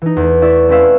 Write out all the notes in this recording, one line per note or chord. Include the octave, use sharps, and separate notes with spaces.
E3 D#4
E2 A3
E4 D5 E5 C#6
A3 C4 C#4 B4 E5 F5